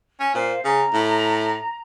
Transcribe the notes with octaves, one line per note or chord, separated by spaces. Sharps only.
C#4
A#2 C5 F5
C#3 A#5
A2